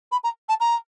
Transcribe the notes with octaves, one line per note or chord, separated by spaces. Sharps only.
B5
A#5
A5
A#5